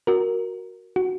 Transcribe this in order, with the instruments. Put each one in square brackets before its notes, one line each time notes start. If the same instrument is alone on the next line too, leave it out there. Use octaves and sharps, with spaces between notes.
[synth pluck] F#4 A#4
F#4